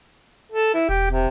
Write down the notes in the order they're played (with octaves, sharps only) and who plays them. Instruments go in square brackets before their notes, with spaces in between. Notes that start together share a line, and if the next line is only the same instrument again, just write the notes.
[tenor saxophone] A4
E4
[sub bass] E1 [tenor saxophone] G4
[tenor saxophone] C3